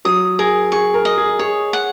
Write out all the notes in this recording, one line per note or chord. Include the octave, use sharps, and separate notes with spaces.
F#3 D#6
G#4 A#4
G#4 C#6
A#4
D#5
G#4
G#4 C#5
F#5